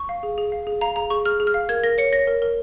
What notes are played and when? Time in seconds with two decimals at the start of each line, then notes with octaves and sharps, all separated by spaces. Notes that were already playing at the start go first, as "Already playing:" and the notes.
Already playing: C#6
0.09 F5
0.23 G#4
0.38 G#4
0.52 F5
0.67 G#4
0.81 F5 A#5
0.96 G#4 A#5
1.10 G#4 C#6
1.25 G#4 F6
1.40 G#4
1.47 F6
1.54 F5
1.69 A#4 G#6
1.83 A#4 A#6
1.98 C#5 C#7
2.12 C#5 A#6
2.27 A#4
2.42 A#4